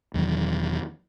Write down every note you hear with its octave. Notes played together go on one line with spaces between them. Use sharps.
E1 E2 D#3 F#3